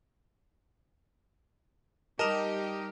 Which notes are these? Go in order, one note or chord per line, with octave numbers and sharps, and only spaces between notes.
G3 D#4 G4 A#4 D#5 A5 A#5 D#6